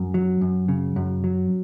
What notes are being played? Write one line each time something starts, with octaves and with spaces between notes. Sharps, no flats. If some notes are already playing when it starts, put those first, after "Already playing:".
Already playing: F#2 C#4
F#3
F#2
C#3
F#2
F#3